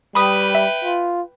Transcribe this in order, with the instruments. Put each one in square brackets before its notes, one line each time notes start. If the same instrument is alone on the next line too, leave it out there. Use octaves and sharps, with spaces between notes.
[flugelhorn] G3 [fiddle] B4 G5 [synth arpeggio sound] B5 D#6
[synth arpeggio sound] E5
[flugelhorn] F4